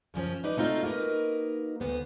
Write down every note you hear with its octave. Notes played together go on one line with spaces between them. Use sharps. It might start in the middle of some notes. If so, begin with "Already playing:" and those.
F#2 C#3 F3 C#4
D#4 B4 D5
A3 C4 D#4 F4 F#4
A#3 D#4 F#4 A#4 B4
D2 B2 B3 C5